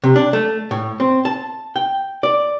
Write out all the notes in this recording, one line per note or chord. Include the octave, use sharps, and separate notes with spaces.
C3
D4
A3
A2
C4
A5
G5
D5